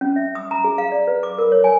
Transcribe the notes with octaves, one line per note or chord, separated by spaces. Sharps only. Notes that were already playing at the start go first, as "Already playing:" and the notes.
C#4
E5
D#6
A#5
G#4
F5
D5
B4
D6
A#4
C#5
G#5